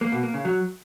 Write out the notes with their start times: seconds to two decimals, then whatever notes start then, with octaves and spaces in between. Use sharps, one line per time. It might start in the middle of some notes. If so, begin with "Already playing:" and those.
0.01 A#3
0.12 B2
0.23 A#3
0.34 C#3
0.45 F#3